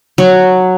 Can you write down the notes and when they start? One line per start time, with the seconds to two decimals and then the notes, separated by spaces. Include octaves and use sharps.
0.18 F#3